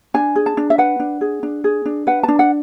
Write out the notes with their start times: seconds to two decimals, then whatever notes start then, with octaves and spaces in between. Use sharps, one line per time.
0.14 D4 G#5
0.36 G#4
0.46 A5
0.57 D4
0.70 E5
0.78 B4 F#5
1.00 D4
1.21 G#4
1.43 D4
1.64 G#4
1.86 D4
2.07 B4 F#5
2.23 D4 A5
2.39 F#5